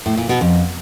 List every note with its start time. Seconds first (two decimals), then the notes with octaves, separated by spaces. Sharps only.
0.06 A2
0.17 A#2
0.29 B2
0.41 F2